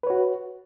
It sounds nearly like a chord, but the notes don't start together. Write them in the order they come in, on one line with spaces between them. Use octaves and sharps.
B4 C#5 F#4